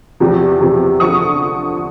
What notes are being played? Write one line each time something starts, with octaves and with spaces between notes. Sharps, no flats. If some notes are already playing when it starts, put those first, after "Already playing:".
E2 C3 F3
E2 C3 F3
D3 F3 C#6 D#6